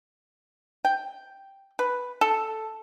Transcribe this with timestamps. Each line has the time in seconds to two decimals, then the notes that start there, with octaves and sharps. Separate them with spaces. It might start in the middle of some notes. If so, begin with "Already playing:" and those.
0.85 G5
1.79 B4
2.21 A4